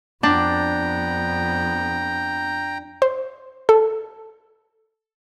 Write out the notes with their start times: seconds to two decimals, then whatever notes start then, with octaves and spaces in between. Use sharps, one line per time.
0.23 F2 B3 D4 G5 A#5
3.02 C5
3.69 A4